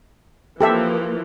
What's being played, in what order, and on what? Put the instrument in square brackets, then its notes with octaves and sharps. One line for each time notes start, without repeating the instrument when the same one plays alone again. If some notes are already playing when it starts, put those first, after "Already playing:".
[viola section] E3 F3 A#3 [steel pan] G4 A4 E5